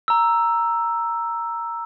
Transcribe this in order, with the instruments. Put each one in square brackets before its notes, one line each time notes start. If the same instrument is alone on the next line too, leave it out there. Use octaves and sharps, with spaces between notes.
[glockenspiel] A#5 E6